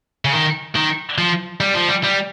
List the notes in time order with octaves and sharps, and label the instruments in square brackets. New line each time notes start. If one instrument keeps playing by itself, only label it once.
[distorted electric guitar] C#3
D#3
D#3
F3
G3
F3
G3
G3